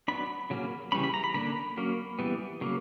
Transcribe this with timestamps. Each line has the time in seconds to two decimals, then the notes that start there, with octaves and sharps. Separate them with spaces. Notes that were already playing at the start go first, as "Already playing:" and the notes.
0.08 F#3 B3 D4 B5
0.50 C#3 F#3 A#3 C#4
0.92 C#3 E3 G3 C#4 B5
1.04 B5
1.14 A#5
1.24 B5
1.34 D3 A#3 D4 B5
1.77 F#3 A#3 C#4
2.19 E3 G3 B3
2.61 C#3 F#3 A#3